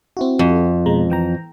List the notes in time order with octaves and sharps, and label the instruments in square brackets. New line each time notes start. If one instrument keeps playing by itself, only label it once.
[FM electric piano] C4 E4 F#4
[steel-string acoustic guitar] F2
[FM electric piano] B2 G#3 A#5
E3 G5 A#5